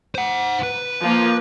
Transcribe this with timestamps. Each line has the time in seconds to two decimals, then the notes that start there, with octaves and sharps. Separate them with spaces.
0.15 C5 F#5
0.63 B4
1.02 F3 A#3